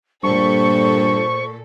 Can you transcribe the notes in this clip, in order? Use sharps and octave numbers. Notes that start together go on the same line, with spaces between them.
G2 A#2 A4 C5 C#6